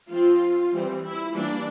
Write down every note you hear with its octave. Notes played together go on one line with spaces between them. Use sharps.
F3 C4 F4
E3 G3 C4
E4
E3 G3 A#3 D4